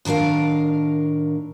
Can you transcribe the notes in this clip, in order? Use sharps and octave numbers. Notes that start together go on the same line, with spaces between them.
A2 D#3 D4 A#4 F5